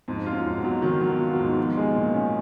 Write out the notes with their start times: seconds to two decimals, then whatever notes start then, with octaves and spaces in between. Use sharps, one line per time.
0.08 F2 G#2
0.26 F4
0.33 F#2
0.45 G#2
0.58 B2
0.65 F#3
0.82 D#3 F#3
1.01 F#3
1.08 B2
1.20 F4
1.33 B2
1.40 G#2
1.57 F3
1.77 G#3
1.95 A#2
2.14 C#4